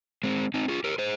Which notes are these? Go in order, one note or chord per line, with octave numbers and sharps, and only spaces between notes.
G#3 C4
C4 D#4
F4 G#4
G4 A#4
G#4 C5